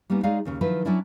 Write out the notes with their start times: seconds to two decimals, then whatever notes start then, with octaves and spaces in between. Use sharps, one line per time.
0.10 G3 A#3 B3 C#4 D#4
0.23 G#3 D#4 G#4 C#5 D5 F5
0.45 D#2 C#3 C#4
0.61 D#3 F3 F#3 E4 F4 B4
0.85 F#3 C#4 D4 E4 D5